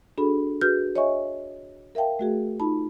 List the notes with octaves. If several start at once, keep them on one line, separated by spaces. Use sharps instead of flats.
D4 F#4 G#4 A4 B5
F#4 G#4 B4 F6 G6
C#5 D#5 E5 G#5 C#6
A#4 E5 F5 G5 A5
A3 F#4 G#4
D#4 F4 A5 B5